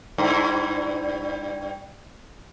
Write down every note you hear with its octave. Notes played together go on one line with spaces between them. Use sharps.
G2 E4